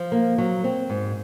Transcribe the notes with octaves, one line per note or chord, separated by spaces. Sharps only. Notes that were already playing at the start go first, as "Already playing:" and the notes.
Already playing: F3
A#3
F#3
C4
G#2